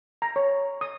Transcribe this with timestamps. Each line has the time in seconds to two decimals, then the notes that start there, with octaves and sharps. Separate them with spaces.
0.22 A#5
0.36 C#5
0.81 D#6